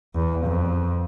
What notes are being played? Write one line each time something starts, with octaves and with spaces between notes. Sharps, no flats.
E2
F2